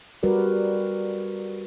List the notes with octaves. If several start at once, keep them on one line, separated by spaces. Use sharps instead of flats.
G3 F#4 A#4 B4 D5